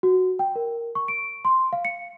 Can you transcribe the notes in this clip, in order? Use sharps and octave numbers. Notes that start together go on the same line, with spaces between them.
F#4
G5
A#4
C#6
D7
C6
F5
C#7